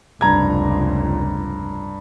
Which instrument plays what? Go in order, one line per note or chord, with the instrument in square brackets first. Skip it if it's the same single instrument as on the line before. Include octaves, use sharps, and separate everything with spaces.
[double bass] F1 C#2 [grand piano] G2 A#5 G#6